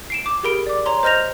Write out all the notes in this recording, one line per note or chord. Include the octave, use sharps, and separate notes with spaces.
C7 D7 E7
D6
G4 G#4 A#4 B5 D7
D5 D6
C#5 A#5 C6
C5 D#5 F6 G6 A#6 F7